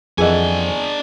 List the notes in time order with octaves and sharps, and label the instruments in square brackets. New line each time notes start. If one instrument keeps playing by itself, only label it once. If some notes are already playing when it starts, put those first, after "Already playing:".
[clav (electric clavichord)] F2 E3 F#5 [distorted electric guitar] D4 G#5 [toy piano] G#4 A#4 D#5